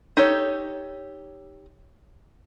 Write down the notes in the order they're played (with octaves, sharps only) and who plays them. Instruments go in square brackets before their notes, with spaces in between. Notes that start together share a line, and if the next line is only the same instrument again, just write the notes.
[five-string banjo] D#4 G4 A4 C#5